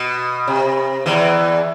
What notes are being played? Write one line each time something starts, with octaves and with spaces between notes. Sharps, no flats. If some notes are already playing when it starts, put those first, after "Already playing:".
Already playing: B2
C3
E2 E3